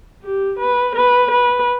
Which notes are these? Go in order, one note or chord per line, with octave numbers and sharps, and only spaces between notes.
G4
B4
B4
B4